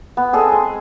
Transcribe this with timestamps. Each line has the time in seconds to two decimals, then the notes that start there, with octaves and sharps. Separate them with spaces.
0.17 B3
0.33 C4 G#4 A4 D#5
0.48 G#3 C6